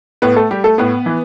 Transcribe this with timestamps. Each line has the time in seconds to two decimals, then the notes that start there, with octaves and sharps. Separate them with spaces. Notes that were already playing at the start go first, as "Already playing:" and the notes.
0.22 A2 B3 B4
0.36 A3 A4
0.51 G3 G4
0.64 A3 A4
0.78 A2 B3 B4
1.06 E3